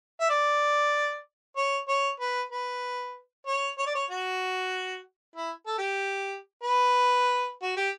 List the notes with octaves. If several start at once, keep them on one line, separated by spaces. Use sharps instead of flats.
E5
D5
C#5
C#5
B4
B4
C#5
C#5
D5
C#5
F#4
E4
A4
G4
B4
F#4
G4